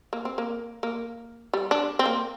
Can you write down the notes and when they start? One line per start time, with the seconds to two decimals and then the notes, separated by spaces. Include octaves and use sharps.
0.13 A#3
0.25 C4
0.38 A#3
0.83 A#3
1.53 G3
1.71 D4
1.99 C4
2.06 A#3